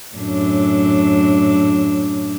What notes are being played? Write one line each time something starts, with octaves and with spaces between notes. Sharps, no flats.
F#2 A2 D4